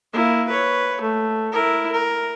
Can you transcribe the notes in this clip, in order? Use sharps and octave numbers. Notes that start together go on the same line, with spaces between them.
A#3 E4
B4 C#5
A3
E4 A#4
A#4